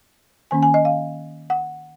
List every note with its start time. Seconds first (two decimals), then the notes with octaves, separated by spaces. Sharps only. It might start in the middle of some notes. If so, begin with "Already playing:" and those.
0.51 D#3 A#3 C#4 G#5
0.63 G#5
0.74 D#5
0.85 F5
1.50 F#5